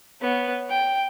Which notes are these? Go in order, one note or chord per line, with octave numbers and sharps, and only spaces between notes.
B3 C#5
G5